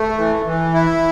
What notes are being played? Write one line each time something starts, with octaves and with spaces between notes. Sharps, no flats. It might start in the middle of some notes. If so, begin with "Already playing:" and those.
Already playing: A3
E3
E3
E4